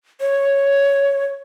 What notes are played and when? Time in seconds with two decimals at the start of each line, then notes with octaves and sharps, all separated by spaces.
0.21 C#5